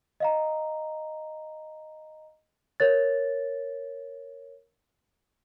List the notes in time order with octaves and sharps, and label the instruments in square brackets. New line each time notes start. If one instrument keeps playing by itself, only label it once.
[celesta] D#5 F5 A#5
A#4 C#5 A6